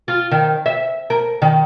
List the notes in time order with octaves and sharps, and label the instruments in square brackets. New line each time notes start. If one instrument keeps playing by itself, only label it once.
[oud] F4
D#3
E5
A#4
D#3